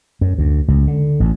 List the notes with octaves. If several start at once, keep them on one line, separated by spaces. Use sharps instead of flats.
F#2
D2
C#2
D3
A1